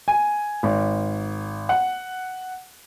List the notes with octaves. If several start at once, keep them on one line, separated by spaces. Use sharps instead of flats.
G#5
G#1
F#5